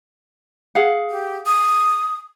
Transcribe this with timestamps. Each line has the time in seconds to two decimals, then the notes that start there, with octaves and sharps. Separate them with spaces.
0.75 G#4 F5 F#5
1.10 G4
1.46 D#6